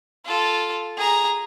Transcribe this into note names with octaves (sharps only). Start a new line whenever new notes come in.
F4 A4
G#4 A#5